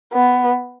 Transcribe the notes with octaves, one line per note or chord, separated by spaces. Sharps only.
B3